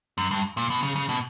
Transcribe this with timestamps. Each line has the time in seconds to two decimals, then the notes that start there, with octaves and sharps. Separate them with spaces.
0.18 F#2
0.31 G2
0.57 A#2
0.70 B2
0.83 C#3
0.96 C#3
1.09 B2